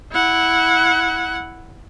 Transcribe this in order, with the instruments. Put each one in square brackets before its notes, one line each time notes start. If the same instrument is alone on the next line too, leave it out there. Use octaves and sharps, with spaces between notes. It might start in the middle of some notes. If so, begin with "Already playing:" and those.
[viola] E4 F#5